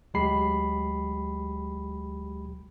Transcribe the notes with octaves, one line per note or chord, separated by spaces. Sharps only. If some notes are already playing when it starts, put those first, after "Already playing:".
D2 F#3 G#3 G4 B5 C7